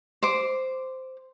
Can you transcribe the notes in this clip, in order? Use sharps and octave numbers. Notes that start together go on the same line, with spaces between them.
C5 D6